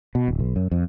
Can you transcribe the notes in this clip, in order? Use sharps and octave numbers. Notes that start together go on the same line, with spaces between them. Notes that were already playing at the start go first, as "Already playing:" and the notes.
B2
D1
B1
F#2
F2